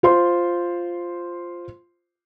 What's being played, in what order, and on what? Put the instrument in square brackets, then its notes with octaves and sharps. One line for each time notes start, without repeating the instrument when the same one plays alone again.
[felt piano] F4 C5 C6